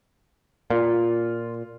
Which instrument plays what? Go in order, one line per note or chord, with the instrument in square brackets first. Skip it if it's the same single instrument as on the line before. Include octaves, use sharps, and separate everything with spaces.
[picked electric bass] A#2 [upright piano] F4